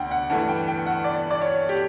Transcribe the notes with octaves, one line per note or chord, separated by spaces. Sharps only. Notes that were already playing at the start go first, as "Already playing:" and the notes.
Already playing: D2 F#5 G5
F#5
G2 E3 A3 F#5
G5
G5
F#5
D5
D5
C#5
G4